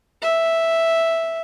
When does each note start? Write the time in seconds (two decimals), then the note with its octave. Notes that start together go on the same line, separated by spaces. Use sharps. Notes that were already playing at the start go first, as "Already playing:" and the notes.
0.22 E5